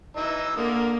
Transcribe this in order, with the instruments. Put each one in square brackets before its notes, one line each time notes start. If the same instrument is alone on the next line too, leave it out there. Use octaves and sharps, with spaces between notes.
[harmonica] E3 D#4 E6
[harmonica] D3 D#6 [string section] A#3